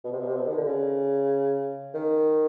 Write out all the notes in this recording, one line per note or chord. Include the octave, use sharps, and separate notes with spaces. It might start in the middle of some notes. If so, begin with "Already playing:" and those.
B2
C3
B2
C3
B2
D#3
D3
C#3
D#3